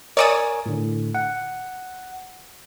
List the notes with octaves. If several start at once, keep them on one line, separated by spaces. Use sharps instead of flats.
A#4 C#5 D5 G#5 D#6
A2 D3
F#5